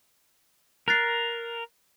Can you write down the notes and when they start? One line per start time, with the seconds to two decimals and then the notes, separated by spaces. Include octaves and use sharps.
0.88 A#4 F#6 A6 C7